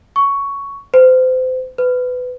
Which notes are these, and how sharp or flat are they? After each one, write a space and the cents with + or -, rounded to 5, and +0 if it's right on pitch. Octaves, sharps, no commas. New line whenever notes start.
C#6 +10
C5 -30
B4 +20